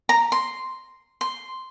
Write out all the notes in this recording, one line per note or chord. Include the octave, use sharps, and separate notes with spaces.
A#5
C6
C6